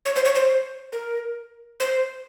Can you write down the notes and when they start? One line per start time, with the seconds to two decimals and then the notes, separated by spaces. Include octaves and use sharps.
0.05 C#5
0.16 C5
0.25 C#5
0.35 C5
0.92 A#4
1.80 C5